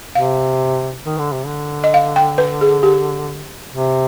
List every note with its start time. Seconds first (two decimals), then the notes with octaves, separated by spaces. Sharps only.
0.15 C3 F5
1.05 D#3
1.18 D3
1.33 C3
1.46 D3
1.84 D#5
1.94 F5
2.16 G5
2.38 B4
2.61 G#4
2.83 G4
3.71 C3